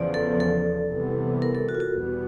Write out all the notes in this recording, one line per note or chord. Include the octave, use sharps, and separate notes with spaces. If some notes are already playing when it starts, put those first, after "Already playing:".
Already playing: E2 C#3 F3 D5
A4
A4
C3 E3 G3 B3
A#4
A4
F#4
F4
F#4
E2 B2 G3 B3